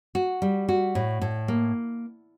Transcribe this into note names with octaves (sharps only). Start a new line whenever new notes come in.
F#4
G3
F#4
A2
A2
A#3